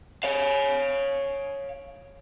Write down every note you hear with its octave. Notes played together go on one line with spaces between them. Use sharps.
C#5 F5